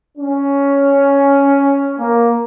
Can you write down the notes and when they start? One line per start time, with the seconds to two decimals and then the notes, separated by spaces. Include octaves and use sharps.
0.18 C#4
1.99 A#3